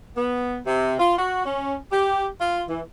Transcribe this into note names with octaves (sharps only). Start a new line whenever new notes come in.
B3
C3
F4
F#4
C#4
G4
F4
E3